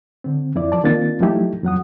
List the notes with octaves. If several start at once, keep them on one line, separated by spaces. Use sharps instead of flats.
D3 C4
F2 E4 D5
F3 D5 A5
D#3 A#3 C4 D4 F4 A6
F3 F#3 A3 D#4 E4 G4
F2 F#3 F#5 D#6